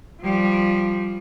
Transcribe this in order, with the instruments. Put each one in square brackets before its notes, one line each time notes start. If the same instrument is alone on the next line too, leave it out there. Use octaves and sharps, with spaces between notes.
[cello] F3 G3